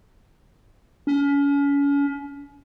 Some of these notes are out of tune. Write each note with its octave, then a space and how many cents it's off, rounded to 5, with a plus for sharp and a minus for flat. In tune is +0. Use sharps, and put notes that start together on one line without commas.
C#4 +35